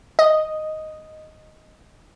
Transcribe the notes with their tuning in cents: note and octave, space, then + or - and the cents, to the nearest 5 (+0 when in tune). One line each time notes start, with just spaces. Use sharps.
D#5 +0